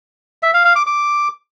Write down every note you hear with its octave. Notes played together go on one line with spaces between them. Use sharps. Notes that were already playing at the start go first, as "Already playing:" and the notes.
E5
F5
F5
D6
D6